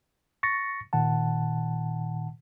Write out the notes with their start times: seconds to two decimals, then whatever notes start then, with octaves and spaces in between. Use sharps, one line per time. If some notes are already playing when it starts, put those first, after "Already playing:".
0.43 C#6 A6 A#6 C#7
0.93 A#2 D#3 F#5 A5